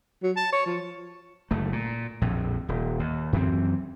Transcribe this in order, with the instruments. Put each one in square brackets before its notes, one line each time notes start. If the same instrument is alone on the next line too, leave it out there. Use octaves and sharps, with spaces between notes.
[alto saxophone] F#3
A5
C#5
F3
[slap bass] F#1 A3
A#2
A#1 F2 A2
D#1
D#2
F#2 E3 C4